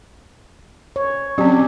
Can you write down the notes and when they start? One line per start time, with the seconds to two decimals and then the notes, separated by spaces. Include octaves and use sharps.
0.96 C#5
1.38 F#3 C4 C#4 G4